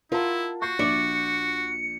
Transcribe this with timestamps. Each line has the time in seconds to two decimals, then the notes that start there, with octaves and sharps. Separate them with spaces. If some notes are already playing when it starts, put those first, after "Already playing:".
0.12 E4 F4 A#4 F#5 A5
0.62 F#4 C#6 G6 C7
0.79 A#1 D4 D5 E5 C#7